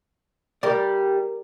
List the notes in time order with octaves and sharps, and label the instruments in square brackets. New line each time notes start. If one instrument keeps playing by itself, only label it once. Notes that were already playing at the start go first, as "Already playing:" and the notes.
[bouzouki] G3 [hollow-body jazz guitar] A#4 D5